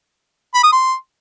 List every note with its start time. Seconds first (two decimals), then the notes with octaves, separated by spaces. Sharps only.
0.54 B5
0.63 D#6
0.72 C6